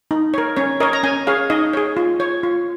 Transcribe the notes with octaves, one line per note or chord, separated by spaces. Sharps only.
D#4
A#4 C#5
C#4 C#5
A#4 C#5 D#5
A#5
C#4 G#5
G#4 C#5 F5
D#4 D#5
G#4 C#5
F4
C#5
F4